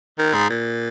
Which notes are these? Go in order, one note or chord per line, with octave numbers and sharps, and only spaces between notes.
D#3
G#2
A#2